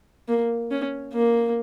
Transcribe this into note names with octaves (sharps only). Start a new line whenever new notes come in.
A#3
C#4
A#3